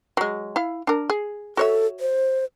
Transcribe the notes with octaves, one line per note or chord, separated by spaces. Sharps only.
F#3 G#3
E4 F5
D4 A#4
G#4
F#4 A4 C#5 E5
C5